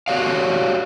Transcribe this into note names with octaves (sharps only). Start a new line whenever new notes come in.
F#4 G4 C#5 D5 F5